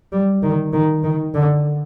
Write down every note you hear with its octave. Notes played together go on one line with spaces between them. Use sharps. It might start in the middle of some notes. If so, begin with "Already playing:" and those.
G3
D#3
D#3
D#3
D3